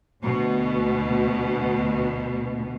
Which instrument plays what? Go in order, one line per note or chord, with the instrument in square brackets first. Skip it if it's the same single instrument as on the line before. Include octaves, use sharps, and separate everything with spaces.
[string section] D2 B2